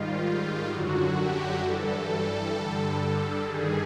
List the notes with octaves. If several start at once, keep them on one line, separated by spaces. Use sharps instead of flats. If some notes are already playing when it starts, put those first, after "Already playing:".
Already playing: G#2 D#3 G3 F4
F#2 D3 F#3 F#4
G4
G2 E3 G3 A4
G2 D3 G3
G2 D#3 G3 G#4